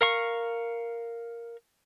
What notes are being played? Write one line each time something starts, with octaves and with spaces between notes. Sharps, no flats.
A#4 F5 C#6